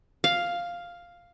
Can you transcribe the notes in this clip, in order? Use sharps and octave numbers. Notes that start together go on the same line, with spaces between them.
F5